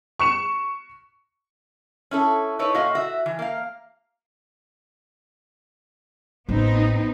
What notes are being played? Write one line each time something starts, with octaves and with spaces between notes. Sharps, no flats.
C#6 C#7 E7
C#4 E4 A4
D#4 E4 A4 B4 C#5
A#2 F#4 D#5 F5
F#4 E5
E3
A#3 F5
A1 B3 C4 D#4